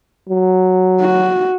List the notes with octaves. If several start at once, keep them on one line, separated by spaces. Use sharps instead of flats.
F#3
F#4